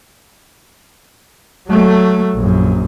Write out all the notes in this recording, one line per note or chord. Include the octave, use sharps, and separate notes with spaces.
F#3 A3
A#1 F#2